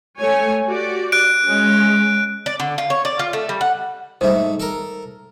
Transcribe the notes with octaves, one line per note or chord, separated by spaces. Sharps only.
A3 C#5 G#5
F#4 G4 D5
F#6 D7
G#3 C#4
D5
D3
F4
C#5
D5
F4
A3
G3
F#5
G#2 G3 A3 C5
A4 A#4